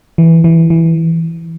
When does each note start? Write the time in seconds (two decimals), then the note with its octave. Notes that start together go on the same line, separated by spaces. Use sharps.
0.18 E3
0.44 E3
0.70 E3